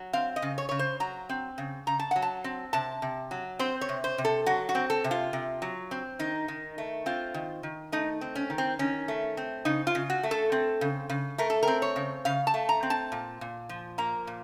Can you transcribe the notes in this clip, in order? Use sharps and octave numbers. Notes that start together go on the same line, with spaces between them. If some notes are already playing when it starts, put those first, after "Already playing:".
Already playing: F#3
C4 F5
D#5
C#3
C#5
C#3 C#5
C5
F#3 A#5
C4
C#3
C#3 A#5
A5
F#3 F#5
A5
C4
C3 A5
C3
F#3
C4 C5
C#5
C3
C5
C3
A4
F#3 F#4
F#4
C4
A4
C3
F4
C3
F#3
C4
D#3 D#4
D#3
A3
C4 F4
D#3
D#3
A3 D#4
C4
C#4
D#3
C4
D#3 C#4
A3
C4
C#3 D#4
F4
C#3
F#4
A3
A4
C4
C#3
C#3
A3 A#4
A4
C4 A#4
C#5
C#3
C#3 F5
A5
A3
A#5
C4
A5
A#2
A#2
F3
A#3 A#5
A#2